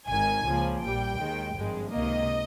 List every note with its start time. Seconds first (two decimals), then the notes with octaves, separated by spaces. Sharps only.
0.08 G#1 G#2 D#3 G#5
0.45 C#2 C#3 F3 A#3
0.81 A#1 A#2 G3 G5
1.19 D#2 D#3 G#3
1.56 G#1 G2 F3 G#3
1.92 C#2 C3 D#3 A#3 D#5